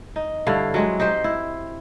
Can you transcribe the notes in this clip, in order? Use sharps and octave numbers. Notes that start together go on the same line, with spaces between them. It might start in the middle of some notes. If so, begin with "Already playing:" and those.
D#4
G2 D3 E4 F5
F#3 G#3 C4
D#4 G4 C5 D#5
E4